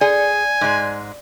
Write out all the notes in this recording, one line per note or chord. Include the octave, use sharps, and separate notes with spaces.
G#4 D5 G#5
G#2 G#3